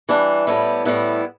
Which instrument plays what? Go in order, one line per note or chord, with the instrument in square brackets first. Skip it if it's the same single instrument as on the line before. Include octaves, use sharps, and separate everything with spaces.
[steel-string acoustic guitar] E3 G3 D4
A2 G3 B3 E4
A2 G3 B3 E4